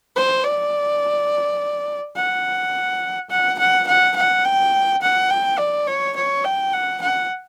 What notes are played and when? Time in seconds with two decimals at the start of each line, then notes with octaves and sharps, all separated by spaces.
0.16 C5
0.44 D5
2.16 F#5
3.30 F#5
3.59 F#5
3.87 F#5
4.16 F#5
4.44 G5
5.02 F#5
5.30 G5
5.58 D5
5.87 C#5
6.16 C#5
6.44 G5
6.73 F#5
7.02 F#5